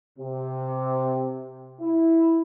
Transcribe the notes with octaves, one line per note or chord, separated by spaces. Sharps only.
C3
E4